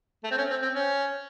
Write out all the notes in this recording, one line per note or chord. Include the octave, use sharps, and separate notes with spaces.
A3
C4
C#4
C4
C4
C#4